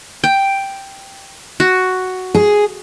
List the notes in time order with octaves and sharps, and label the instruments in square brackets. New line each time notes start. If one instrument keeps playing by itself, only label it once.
[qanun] G5
F#4
[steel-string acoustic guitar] G#4